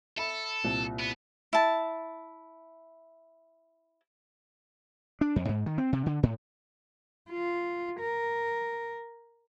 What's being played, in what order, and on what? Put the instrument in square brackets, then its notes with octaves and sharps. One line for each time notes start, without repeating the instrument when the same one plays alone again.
[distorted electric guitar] A4 [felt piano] E5 B5
[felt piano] C2 A#2
[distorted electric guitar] B3
[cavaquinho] E4 A5
[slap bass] D4
F2
G#2
D#3
C4
C3
D3
A2
[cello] F4
A#4